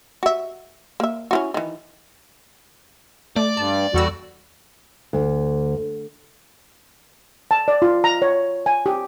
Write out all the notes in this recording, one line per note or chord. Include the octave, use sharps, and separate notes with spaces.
F#4 E5
A#3 E5
C#4 E4 F#4
D#3 E3
A3 D5
G2 A5
E2 G3 F#4 A4 E6
D2
A5
D5
F4
A#5
C#5
G#5
G4